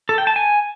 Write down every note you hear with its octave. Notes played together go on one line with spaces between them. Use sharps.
A4
G5
A5
G#5